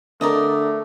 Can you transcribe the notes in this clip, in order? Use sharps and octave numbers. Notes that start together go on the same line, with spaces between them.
D3 A3 A#4 D5 D#5